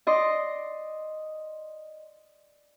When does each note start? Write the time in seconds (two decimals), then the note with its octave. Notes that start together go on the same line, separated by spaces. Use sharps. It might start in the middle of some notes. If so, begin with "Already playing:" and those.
0.07 D5 D#5 C6